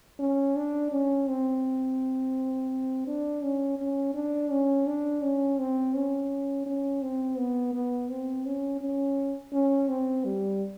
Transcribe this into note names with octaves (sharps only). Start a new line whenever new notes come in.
C#4
D4
C#4
C4
D4
C#4
C#4
D4
C#4
D4
C#4
C4
C#4
C#4
C4
B3
B3
C4
C#4
C#4
C#4
C4
G3